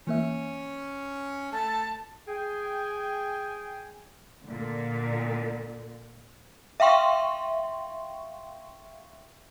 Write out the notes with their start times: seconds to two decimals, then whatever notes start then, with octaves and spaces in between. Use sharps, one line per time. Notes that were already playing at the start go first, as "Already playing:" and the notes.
0.07 E3 A#3 C#4 E5
1.52 A3 A5
2.28 G#4 G5 G#5
4.47 A#2 D3
6.80 E5 F5 G5 C6 C#6